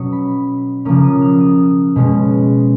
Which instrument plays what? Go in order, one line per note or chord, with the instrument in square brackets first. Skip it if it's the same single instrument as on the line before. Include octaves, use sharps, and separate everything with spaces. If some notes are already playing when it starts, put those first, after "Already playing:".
Already playing: [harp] B2 F#3 C#4 C#6 D#6
B5
C#3 F3 A#3 C#4 D#6
D#6
F6
D#6
B2 G#3 C#4